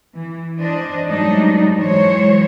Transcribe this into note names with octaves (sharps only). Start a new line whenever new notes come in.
E3
E3 D4 C5 D#5
G#2 F#3 G3 A3 D4 D#4
E3 F#3 G#3 C5 C#5